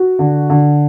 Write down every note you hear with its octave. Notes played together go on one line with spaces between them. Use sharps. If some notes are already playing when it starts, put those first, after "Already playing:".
Already playing: F#4
D3
D3